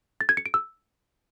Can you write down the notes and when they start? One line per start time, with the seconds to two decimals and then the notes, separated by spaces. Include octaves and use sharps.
0.21 A6
0.29 G#6
0.37 C#7
0.46 D7
0.54 E6